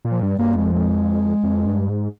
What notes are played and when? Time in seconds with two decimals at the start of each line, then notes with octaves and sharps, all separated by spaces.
0.05 A#2
0.11 F3
0.22 G2 G3
0.39 G2 A#3
0.56 F2 G#3
0.73 G#3
1.43 F2
1.66 G2
1.89 G#2